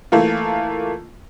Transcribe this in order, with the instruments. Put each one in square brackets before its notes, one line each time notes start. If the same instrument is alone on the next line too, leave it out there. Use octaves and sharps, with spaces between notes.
[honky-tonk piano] E3 A3 A#3 F4